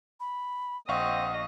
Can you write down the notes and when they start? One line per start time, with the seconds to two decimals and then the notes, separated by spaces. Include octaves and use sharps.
0.20 B5
0.88 A#1 C4 D#5 F5 F#5 C#6